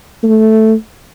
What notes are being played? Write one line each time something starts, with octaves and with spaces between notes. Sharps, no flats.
A3